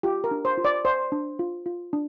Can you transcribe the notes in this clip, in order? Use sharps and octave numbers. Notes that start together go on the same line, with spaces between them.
F4 G4
A#4
D4
C5
F4
D5
C5 D5
D4
F4
F4
D4